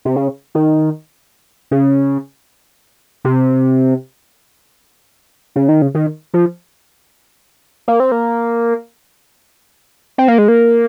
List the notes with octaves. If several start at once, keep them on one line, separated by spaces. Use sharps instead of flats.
C3
C#3
D#3
C#3
C3
C#3
D#3
C#3
D#3
F3
A#3
C4
A#3
C4
A#3
G#3
A#3